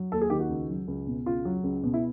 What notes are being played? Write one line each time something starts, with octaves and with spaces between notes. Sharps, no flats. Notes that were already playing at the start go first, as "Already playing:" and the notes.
Already playing: F#3
D#2 A4
G#4
D#3 G4
F#4
C#2
F#3
C#2
B2
C#2 F4
F#3
C#2
B2
E4